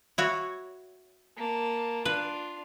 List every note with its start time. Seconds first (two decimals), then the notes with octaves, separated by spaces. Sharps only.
0.18 E4 F#4 C#5
1.36 A#3 A5
2.05 D4 F4 B4